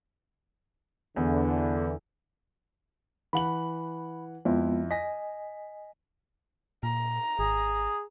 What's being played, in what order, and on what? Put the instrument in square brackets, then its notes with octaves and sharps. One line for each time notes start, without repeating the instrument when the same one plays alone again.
[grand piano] E2 [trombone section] D3 E3
[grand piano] E3 F#5 F#7 [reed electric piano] B5
[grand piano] F2 E4 [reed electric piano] G#3 B3 F4
[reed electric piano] D#5 G#5 [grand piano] A#6 B6
[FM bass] A#2 [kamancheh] A#5
[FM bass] G#1 [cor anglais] G#4